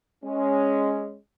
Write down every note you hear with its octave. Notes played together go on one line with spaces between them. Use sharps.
G#3 C#4